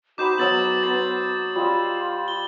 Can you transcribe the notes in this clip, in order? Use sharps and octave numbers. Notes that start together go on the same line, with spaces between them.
D#4 F#4 C5 B5 D6 G6 E7
F#3 B3 D#4 G#4 E6 A6 F#7
B4 C5 A6
G3 F4 D#5 E6
G7